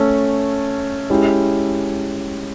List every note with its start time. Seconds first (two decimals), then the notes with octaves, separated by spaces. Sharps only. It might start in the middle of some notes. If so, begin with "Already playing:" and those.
Already playing: A3 C#4 A4
1.10 G#3 C#4 E4 G4